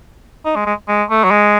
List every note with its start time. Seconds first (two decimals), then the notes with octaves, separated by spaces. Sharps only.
0.45 D#4
0.55 G#3
0.66 G#3
0.88 G#3
1.09 A3
1.24 F#3
1.31 G#3